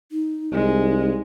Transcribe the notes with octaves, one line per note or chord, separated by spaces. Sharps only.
D#4
C2 G#3